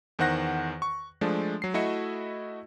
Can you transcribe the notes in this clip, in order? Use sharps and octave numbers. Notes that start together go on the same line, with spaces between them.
E2 D#3 C5 F#5 F#6 A#6
C#6
F3 G#3 A3 D4
F#3 C7
A3 E4 F#4 D#5 E5 C#7